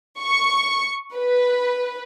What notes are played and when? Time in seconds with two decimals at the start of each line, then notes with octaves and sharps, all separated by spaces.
0.21 C#6
1.17 B4